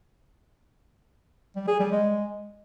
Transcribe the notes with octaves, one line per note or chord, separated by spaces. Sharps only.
G3
G#4
G3
G#3